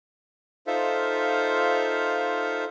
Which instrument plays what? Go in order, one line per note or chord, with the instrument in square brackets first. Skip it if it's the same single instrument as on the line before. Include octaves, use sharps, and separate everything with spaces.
[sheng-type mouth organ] D#4 F4 A4 C5 E5 F5